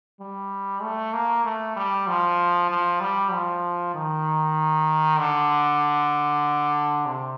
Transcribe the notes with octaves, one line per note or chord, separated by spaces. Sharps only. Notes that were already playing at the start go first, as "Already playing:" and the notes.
G3
A3
A#3
A3
G3
F3
F3
G3
F3
D#3
D3
C3